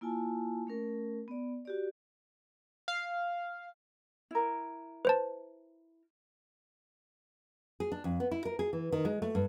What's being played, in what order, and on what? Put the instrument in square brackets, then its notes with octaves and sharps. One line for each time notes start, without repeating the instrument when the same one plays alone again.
[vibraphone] A#3 E4 F4 G#5 A5
A3 C#4 A#4
B3 D5
F#4 G4 D5
[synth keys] F5
[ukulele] E4 A#4
[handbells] B4 C5 A5
[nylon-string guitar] G#4
D4
F2
B3
E4
A#4
G#4
E3
D#3
G#3
A3
G2